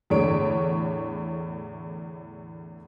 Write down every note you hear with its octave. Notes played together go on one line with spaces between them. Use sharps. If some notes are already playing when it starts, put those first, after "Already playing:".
E2 A2 D3 C#5 D7